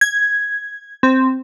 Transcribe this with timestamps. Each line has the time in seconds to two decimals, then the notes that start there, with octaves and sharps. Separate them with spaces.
0.01 G#6
1.03 C4